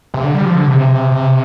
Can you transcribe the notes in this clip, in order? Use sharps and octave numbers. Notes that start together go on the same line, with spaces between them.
C3
D3
G3
F3
D3
C3
C3